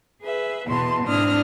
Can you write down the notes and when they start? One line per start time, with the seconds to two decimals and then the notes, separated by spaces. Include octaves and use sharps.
0.21 G#4 B4 E5
0.66 E2 B2 B3 A5 C6
1.05 G#2 C4 D4 E4 D#6 F6